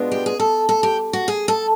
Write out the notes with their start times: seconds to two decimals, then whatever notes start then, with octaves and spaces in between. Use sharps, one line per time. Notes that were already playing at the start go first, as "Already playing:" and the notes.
Already playing: B2 G#3 B3 D4 F4
0.11 G4
0.26 G#4
0.40 A4
0.69 A4
0.83 G4
1.13 F#4
1.28 G#4
1.48 A4